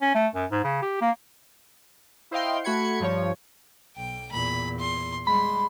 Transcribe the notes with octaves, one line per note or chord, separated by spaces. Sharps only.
C#4
A3
F#2
G#2
C#3
G4
A#3
E4 C5 D#5 F5 G5 C6
A3 F#4 B5 G#6 C#7
G2 F3 C#5
B1 G5
E2 A#2 B5
C6
G3 G#3 B5 C6